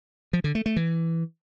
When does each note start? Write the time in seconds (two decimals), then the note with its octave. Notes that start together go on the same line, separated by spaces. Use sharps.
0.33 F3
0.44 D3
0.55 A3
0.66 A3
0.76 E3